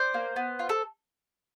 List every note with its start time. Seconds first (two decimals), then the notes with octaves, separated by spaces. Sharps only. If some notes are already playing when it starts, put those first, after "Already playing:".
Already playing: D4 C5
0.14 A#3
0.36 B3
0.59 F4
0.69 A4